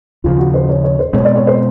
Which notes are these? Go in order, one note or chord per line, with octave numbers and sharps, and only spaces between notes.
D#2 C#3 F3 F4
F#4
C5
C#5
C#5
C5
B2 G#3 C4 C#5
D5
C#5
C5